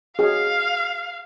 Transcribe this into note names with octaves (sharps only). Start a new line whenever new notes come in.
F#4 G#4 F5